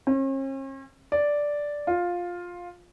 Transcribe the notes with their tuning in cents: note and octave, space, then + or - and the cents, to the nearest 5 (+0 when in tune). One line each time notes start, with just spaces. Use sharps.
C#4 -45
D5 -5
F4 +10